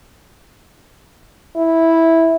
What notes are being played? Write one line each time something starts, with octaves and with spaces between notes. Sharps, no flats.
E4